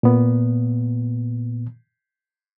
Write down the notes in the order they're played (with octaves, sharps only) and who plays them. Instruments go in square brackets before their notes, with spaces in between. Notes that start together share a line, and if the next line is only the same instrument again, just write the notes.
[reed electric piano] A#2 B3